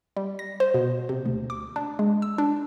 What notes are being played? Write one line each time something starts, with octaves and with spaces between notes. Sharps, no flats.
G3
A#6
C5
B2
C3
D2
D6
D4
G#3
E6
D4